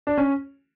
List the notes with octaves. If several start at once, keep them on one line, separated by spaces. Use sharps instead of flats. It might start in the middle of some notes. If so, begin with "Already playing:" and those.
D4
C#4